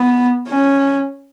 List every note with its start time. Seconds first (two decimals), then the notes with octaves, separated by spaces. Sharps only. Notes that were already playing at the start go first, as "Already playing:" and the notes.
Already playing: B3
0.47 C#4